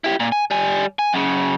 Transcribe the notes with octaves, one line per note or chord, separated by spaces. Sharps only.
E4 G4
A#2
G#5
G3 G#5
G#5
F#2 C#3